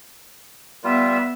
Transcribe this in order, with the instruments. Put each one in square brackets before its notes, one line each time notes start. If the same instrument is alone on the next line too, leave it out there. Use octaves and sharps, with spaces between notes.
[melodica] G3 F4 [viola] B3 E5